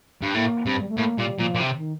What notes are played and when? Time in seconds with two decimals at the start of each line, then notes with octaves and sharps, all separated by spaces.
0.22 G2
0.34 A2 A#3
0.66 G2 C4
0.80 G3
0.89 A3
0.97 A2 A#3
1.18 A#2 G3
1.39 A#2 F3
1.55 A#2
1.60 C3
1.76 D#3